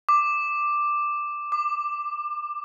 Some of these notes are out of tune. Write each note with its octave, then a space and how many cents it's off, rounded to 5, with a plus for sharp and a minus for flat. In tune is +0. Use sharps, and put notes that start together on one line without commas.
D6 +5
D6 +30